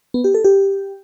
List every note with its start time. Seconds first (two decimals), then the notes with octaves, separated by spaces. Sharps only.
0.14 B3
0.24 G4
0.34 A4
0.44 G4